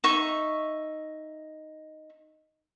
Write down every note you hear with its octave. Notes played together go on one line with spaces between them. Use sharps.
D#4 E5 C#6